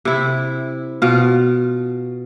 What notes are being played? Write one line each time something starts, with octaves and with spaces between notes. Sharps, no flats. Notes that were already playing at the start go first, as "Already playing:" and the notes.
C3 E4
B2 F4